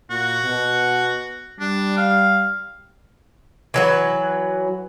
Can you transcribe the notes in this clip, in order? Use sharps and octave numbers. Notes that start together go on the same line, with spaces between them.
A#2 F#4
B2
G3 D4
F5
E3 F#3 B4